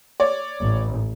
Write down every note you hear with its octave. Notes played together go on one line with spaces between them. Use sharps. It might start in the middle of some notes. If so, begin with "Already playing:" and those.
C#5 D5
A1